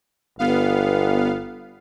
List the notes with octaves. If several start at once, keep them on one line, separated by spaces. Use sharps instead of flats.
G1 B3 F5